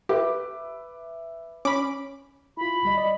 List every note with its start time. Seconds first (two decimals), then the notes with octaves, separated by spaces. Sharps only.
0.09 G4 B4 E5 D6
1.65 C#4 B5 D6
2.57 E4 F4 B5
2.83 D2 G3 D#5
2.97 D5 D#5